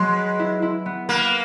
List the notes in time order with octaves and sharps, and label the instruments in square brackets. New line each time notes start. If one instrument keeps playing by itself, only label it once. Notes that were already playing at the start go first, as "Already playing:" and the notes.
Already playing: [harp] F#3 [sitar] G#3
[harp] B4
E4
E4
B3
[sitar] A#3 [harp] B4